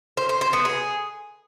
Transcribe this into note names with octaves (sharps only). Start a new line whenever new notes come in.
C5
C5
C5
B3
G#4